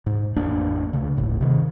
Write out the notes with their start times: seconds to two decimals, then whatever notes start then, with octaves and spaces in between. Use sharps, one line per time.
0.06 G#2
0.36 A1 F2 A#3 D4
0.93 D2 C#3
1.17 D1 G1 A2
1.41 C3 D#3